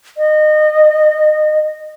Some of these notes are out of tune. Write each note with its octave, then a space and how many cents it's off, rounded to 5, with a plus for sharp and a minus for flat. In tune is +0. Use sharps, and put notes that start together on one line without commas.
D#5 -25